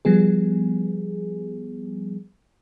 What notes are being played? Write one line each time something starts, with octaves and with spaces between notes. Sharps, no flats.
F3 G3 B3 G#4